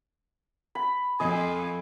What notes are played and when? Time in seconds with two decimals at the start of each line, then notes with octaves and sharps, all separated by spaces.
0.75 B5
1.20 F2 D#5 G#5